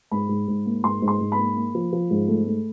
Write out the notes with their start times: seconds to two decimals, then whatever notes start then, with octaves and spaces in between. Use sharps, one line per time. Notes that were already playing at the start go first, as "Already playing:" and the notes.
0.11 G#2 B5
0.29 G#2
0.48 G#2
0.66 A#3
0.84 G#2 C6
1.02 G#2
1.08 C6
1.21 G#2
1.32 B5
1.39 A#3
1.56 A#3
1.75 F3
1.93 F3
2.11 G#2
2.28 A3
2.47 A3